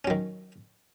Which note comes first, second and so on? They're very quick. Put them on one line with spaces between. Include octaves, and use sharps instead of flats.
C#4 F#3 D#3